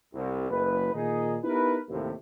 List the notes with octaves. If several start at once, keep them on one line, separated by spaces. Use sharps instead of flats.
C2
F#1 B4
A#2 D#3 D#4 G#4
B3 D#4 E4 G4 A#4 B4
A1 D#2 A2 C3